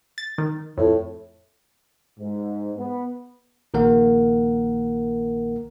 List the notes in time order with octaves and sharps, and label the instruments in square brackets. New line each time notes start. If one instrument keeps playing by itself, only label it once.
[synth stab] A6
D#3
[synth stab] F2 [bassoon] A2
[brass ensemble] G#2
B3
[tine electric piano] A#1 D#3 A#3 A#4 F#5